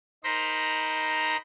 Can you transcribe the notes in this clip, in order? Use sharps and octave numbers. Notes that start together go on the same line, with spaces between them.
D#4 A#4 C5 A#5 B5